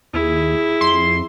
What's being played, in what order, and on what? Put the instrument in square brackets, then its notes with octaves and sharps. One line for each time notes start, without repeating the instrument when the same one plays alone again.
[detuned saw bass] D#2 [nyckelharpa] E4 G#4
[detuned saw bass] F2 [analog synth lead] C6